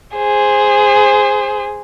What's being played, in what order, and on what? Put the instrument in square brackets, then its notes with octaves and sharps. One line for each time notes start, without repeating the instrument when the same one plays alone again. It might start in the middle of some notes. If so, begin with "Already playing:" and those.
[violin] G#4 C5